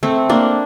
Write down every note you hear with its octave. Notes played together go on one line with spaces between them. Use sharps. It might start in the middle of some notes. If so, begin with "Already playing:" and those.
A3 C4
A#3 D4